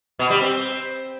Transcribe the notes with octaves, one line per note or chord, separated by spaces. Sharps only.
B2
G3
C4